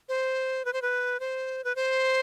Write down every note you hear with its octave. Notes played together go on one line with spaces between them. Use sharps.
C5
B4
C5
B4
C5
B4
C5